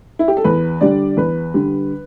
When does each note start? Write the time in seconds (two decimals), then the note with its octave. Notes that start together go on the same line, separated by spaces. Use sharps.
0.19 E4
0.28 G4
0.37 A4
0.44 E2 B4
0.81 D3 G3 D5
1.17 E2 B4
1.54 D3 G3